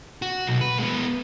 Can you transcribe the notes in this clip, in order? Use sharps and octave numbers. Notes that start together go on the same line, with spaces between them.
F#4
B1
B4
G#3 B3